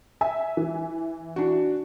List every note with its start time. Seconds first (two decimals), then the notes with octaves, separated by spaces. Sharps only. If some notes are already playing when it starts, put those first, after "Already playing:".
0.21 E5 G#5
0.57 E3
1.36 D4 F#4